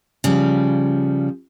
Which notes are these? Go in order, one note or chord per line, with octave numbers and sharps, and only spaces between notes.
C#3 F3 G3